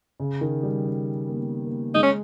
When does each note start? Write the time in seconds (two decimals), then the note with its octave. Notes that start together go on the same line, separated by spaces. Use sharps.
0.20 C#3
0.41 D#3
0.63 G3
0.85 C#4
1.29 A#3
1.36 B3
1.66 A#3
1.95 G#3 D#4
2.03 C#4